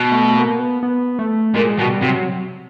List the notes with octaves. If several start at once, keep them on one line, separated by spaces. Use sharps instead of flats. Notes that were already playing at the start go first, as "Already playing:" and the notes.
Already playing: B2
A3
A#3
B3
B3
A3
A#2 G#3
B2 G3
C3 F#3